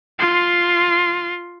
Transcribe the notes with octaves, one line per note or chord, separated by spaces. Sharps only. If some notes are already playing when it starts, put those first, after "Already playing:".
F4 C6